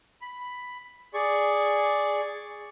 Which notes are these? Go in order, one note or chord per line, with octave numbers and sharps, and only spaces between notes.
B5
G#4 D5 C#6